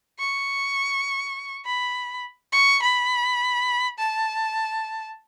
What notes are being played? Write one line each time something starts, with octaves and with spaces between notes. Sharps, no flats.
C#6
B5
C#6
B5
A5